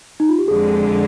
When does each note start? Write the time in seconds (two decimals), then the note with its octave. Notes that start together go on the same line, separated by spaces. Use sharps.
0.20 D#4
0.29 F4
0.39 G4
0.47 F2 D3 G#3 G#4